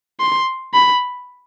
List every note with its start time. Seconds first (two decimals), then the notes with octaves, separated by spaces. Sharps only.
0.20 C6
0.74 B5